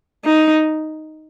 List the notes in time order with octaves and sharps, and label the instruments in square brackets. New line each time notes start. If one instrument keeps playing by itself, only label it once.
[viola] D#4